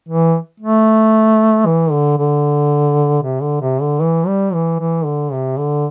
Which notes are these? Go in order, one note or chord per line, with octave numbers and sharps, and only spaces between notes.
E3
A3
E3
D3
D3
C3
D3
C3
D3
E3
G3
E3
E3
D3
C3
D3